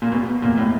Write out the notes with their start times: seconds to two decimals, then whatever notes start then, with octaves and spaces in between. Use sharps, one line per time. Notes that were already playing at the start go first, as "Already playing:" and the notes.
0.02 A#2
0.12 E2 B2
0.42 F1 A#2
0.57 A2